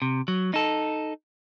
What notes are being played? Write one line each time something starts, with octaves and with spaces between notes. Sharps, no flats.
C3
F#3
D#4 A4